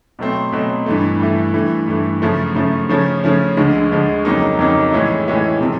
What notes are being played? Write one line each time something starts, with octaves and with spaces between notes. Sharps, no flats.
B2 F#3 A3 C4
B2 F#3 A3 C4
G2 E3 A3
G2 E3 A3
G2 E3 A3
G2 E3 A3
F#2 C#3 F3 A3
F#2 C#3 F3 A3
C#3 F3 A3 C#4
C#3 F3 A3 C#4
D2 D3 F3 G#3
D2 D3 F3 G#3
F2 C#3 F#3 A#3 D#4
F2 C#3 F#3 A#3 D#4
A2 E3 G#3 C#4 E4
A2 E3 G#3 C#4 E4
C3 F3